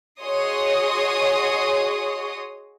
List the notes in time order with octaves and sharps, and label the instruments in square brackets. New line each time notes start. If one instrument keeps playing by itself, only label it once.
[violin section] F#4 G#4 C#5 D#5 C6 D#6